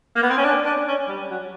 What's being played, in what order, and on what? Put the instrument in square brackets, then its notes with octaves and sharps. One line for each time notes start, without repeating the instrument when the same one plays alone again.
[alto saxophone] A#3
B3
C4
C#4
D4
D4
C#4
G3
F#3